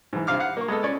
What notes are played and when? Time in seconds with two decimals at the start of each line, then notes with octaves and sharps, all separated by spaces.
0.13 G#2 E3
0.27 G2 C3 F5 D6 F6
0.40 F5 F#5
0.57 A#3 C#6
0.68 G#3 B3 A4
0.83 C#4 D5